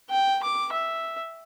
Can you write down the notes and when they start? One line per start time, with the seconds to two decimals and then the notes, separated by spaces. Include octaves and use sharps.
0.10 G5
0.43 D6
0.73 E5